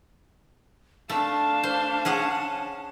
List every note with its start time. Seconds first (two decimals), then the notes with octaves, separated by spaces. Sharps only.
1.10 A3 D4 F5 A5
1.63 C5
2.05 C#4 G#4 F#5